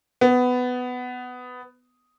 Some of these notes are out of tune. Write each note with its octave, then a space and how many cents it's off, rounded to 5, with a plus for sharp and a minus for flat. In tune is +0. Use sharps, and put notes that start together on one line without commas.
B3 +15